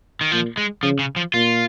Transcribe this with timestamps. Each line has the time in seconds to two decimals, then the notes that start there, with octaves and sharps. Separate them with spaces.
0.21 D#3
0.32 A#2 F3
0.57 G#3
0.83 C#3 F3
0.99 C#3
1.16 F3
1.34 A#2 F4